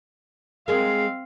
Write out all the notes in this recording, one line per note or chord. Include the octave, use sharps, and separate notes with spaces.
G#3 C4 G#4 A#4 F5